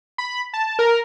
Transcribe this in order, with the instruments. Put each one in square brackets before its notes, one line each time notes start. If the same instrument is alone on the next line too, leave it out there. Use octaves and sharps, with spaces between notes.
[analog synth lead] B5
A5
A#4